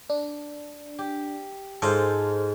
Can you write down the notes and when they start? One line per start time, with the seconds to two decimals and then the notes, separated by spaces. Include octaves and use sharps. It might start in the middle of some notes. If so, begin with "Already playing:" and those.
0.10 D4
0.98 G4
1.82 G#2 D#4 F4 A4 C5